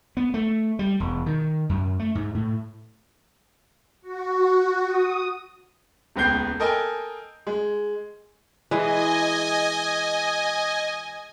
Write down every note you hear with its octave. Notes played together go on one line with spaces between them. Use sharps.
B3
A3
G3
E1
D#3
F#2
A3
G#2
A2
F#4
D#6
D#1 C#2 B3 G5 G6 C7
A4 A#4 D#5 G5 G#5
G#3
E3 G#3 D#5 G#5